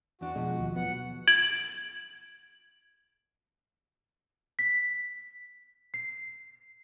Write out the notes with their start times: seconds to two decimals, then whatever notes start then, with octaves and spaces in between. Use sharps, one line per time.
0.21 E2 D4 F#4
0.35 B2 F3 G#3
0.59 D#2
0.76 F#3 B3 F#5
1.28 G#6 D7 F#7
4.59 B6
5.94 C7